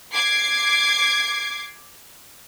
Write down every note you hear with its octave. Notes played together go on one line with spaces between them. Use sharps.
D6 G#6 C7